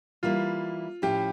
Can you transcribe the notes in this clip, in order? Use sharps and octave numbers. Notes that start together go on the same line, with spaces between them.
E3 G3 A#3 E4 F4
A2 F3 C#4 E4 G4